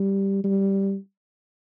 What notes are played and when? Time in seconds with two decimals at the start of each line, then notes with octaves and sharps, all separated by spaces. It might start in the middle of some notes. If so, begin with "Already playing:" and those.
Already playing: G3
0.44 G3